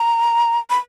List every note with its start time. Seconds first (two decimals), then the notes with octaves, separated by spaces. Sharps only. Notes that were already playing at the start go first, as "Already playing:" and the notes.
Already playing: A#5
0.70 B5